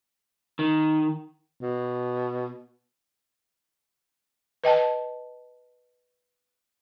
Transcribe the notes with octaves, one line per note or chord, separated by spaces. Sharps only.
D#3
B2
B4 D#5 G5 A5